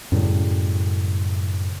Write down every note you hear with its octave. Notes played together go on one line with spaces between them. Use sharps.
F#2 A2 C#3 G3